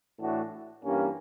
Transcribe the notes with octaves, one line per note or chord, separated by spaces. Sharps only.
A2 E3 A3 D4 F#4
G2 E3 G3 A#3 C#4